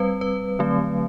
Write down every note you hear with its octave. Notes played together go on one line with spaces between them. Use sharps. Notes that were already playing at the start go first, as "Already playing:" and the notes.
Already playing: G3 C4 B4
B4
D3 F#3 A3 C4